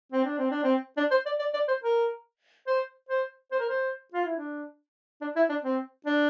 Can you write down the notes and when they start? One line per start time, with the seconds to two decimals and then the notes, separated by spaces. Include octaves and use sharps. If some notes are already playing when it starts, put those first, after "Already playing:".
0.12 C4
0.25 D4
0.38 C4
0.51 D4
0.64 C4
0.97 D4
1.11 C5
1.26 D5
1.39 D5
1.54 D5
1.68 C5
1.82 A#4
2.67 C5
3.09 C5
3.52 C5
3.60 A#4
3.69 C5
4.14 F4
4.25 E4
4.37 D4
5.21 D4
5.36 E4
5.49 D4
5.64 C4
6.06 D4